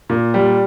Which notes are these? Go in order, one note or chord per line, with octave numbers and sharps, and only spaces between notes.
A#2
G3